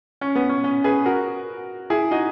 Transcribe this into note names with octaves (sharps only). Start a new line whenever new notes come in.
C#4
B3
C#4
C#4
G#4 B4
F#4 A#4
E4 G#4
D#4 F#4